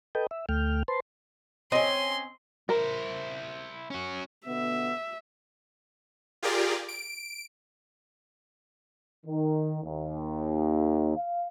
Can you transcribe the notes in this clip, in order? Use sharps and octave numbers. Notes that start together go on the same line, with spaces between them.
A4 B4 D#5 G5
E5
D2 A3 G5 F6
B4 C5 A5 C6
C4 C#4 D#5 C6
E4 A#4 C5
C#4 F#4
B2 D3 B3 E5
F4 G4 G#4 A#4 D5
D7
D#3
D#2
F5